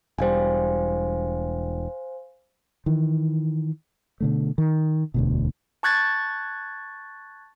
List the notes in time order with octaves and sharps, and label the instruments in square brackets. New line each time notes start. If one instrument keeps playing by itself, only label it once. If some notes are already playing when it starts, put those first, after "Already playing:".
[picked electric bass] E1 G3 [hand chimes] C5 F5 G#5
[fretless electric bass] D#3 E3
B2 D3 A3
D#3
E1 D2 B2
[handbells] A5 C#6 F#6 G#6 A6